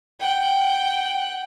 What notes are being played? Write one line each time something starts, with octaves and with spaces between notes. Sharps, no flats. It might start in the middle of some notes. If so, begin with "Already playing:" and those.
F#5 G5